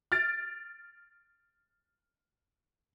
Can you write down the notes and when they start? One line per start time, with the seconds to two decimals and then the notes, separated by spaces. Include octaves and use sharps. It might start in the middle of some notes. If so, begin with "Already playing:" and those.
0.12 F6 A6 D7